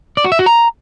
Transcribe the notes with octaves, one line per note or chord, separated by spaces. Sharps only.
D5
F#4
E5
F#4
A#5